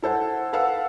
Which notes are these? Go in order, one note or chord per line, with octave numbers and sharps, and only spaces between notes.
E4 A4 C5 F#5
A4 B4 F5 F#5 E6